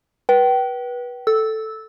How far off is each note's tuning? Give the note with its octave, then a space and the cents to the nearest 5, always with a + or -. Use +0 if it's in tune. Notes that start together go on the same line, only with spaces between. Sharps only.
B4 -25 G5 -30
A4 +0 E6 -10